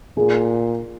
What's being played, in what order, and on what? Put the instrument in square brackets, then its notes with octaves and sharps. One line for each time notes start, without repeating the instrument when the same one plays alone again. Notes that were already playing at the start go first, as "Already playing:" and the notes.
[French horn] A#2 [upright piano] G#4